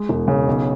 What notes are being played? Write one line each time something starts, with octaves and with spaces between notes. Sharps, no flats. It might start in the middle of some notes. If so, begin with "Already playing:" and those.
Already playing: G#3
E1
C#3
B1